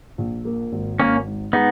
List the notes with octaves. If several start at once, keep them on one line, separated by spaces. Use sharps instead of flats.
A#1
A#3
G#1
G#1 A#3 C#4
G#2
G#3 B3 D#4